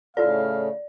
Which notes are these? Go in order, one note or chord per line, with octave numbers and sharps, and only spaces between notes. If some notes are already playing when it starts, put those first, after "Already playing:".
A2 C#3 E4 F4 A4 D5 F5